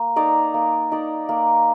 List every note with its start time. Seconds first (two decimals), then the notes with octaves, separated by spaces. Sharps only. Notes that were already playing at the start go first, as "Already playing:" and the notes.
Already playing: A#3
0.16 D#4 A#4 D5
0.54 A#3
0.92 D#4 A#4 D5
1.29 A#3